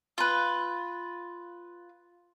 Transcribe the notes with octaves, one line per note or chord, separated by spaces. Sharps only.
F4 B4